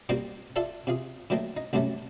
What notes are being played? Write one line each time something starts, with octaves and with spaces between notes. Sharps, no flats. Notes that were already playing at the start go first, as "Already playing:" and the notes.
G3 A#3 C4 F#4 G4
F4 A4 D5 E5 A5
C3 F4 G#4
D3 D#3 F#3 A3 A#3
D#4
D2 G2 C3 F#3 A3 C#4